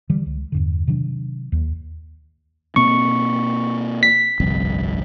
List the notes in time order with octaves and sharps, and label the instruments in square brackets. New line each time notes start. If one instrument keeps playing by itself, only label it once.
[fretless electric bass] D3 E3 G3
C#2
E2 G2 D3
C3 D#3 F#3 D4
D#2
[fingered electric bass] B2 A#3 C4 [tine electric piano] C#6
[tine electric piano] B6
[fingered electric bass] G1 C2 F2